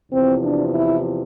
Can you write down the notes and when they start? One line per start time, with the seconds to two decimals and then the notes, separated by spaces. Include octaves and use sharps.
0.12 E2 C3 F3 C4
0.43 D4
0.74 E4